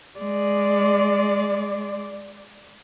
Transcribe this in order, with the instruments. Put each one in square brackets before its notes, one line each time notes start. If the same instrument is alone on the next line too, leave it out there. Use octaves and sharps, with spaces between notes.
[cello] G#3 D5